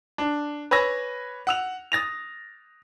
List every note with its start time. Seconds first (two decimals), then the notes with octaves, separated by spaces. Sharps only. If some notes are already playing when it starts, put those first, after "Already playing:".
0.18 D4
0.71 B4 C#5 G#5 E6 A#6
1.47 F#5 E6 F7
1.92 D#6 A6 A#6 F7